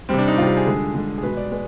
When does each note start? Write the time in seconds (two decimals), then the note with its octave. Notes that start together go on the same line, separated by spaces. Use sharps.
0.09 C3 G3 C4
0.19 D4
0.28 D#4
0.38 C3 G3 F4
0.47 G4
0.57 G#4
0.66 D3 G#3
0.95 D3 G#3
1.18 G#4
1.23 B2 G#3 B4
1.37 D5
1.52 G#3 B4